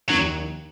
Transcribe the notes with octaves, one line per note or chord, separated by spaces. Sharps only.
D#2 D#3 F#3